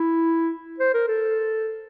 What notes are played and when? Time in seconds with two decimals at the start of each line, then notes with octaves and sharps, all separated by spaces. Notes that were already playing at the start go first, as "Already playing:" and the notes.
Already playing: E4
0.80 C5
0.94 A#4
1.08 A4